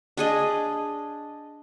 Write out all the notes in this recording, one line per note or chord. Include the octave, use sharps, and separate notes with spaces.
D4 G#4 D#5